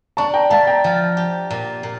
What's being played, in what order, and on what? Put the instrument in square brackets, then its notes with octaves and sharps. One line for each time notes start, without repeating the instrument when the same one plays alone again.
[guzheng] D4 [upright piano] A5 C#6
[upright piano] G5 A#5
[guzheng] A3 [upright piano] F5 A5
[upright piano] G5 A#5
[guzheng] F3
G4
A#2
A#2